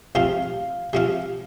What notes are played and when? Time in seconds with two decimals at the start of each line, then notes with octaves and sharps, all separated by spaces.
0.15 C3 F3 C4 F4 F5
0.93 C3 F3 C4 F4